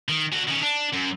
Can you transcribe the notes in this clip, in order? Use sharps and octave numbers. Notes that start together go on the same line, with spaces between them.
D#3
D3 F#4
D#3 C#4
D4
F#2